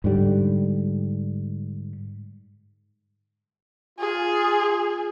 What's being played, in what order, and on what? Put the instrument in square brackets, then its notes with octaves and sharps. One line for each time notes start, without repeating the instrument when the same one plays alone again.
[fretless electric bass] G#2 D3 G3
[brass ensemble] F4 [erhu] G#4